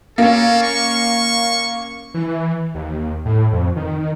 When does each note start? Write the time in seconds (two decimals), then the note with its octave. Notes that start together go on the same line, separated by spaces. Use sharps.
0.18 A#3 C#4 A4
0.63 C#6
2.14 E3
2.75 D#2
3.25 A2
3.52 F2
3.76 D#3